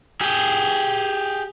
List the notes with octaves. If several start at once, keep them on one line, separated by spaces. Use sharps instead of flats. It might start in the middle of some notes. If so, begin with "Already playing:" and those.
G4 G#4